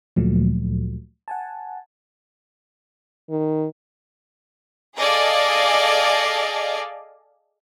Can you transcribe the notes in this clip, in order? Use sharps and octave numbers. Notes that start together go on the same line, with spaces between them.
D2 A#2 F3 F#3 A3
F#5 G#5 A5
D#3
G#4 A4 D5 D#5 F5 G#5